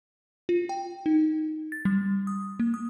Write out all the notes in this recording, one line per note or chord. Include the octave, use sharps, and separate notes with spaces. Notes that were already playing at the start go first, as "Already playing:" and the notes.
F4
G5
D#4
A6
G3
D#6
A#3
D#6